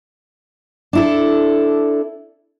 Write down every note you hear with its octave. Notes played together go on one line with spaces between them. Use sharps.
D4 E4 A4